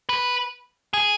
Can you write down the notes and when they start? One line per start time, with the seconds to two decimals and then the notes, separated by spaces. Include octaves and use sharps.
0.09 B4
0.94 G#4